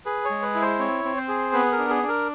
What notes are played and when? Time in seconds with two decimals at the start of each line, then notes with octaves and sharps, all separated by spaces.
0.06 G#4 B4
0.25 C#5
0.30 G#3
0.42 B4
0.55 E4
0.62 C5
0.79 C4 C#5
1.05 C4
1.17 C5
1.28 G#4
1.53 B3 B4
1.72 A#4
1.78 D4
1.90 G#4
2.03 D4
2.08 A#4